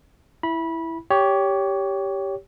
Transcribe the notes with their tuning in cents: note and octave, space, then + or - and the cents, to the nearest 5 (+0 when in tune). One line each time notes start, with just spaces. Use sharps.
E4 +0 B5 -20
G4 +0 C#5 +20